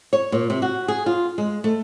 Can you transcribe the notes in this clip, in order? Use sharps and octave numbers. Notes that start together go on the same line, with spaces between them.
C#5
A#2
C3
F#4
G#4
F4
G#3
A3